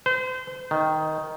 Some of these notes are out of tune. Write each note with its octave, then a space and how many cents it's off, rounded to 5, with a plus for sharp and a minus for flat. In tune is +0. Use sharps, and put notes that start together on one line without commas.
C5 -35
D#3 +5